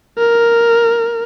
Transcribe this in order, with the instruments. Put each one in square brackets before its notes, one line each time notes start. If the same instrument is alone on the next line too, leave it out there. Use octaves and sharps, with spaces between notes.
[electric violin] A#4